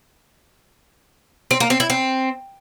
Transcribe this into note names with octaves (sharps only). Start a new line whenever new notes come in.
C4
A#3
C4
E4
C4